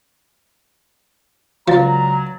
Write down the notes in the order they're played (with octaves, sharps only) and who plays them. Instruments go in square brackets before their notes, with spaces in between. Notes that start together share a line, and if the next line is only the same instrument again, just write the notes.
[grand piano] C#2 D5 A6 [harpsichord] F3 [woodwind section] F#3 [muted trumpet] A#5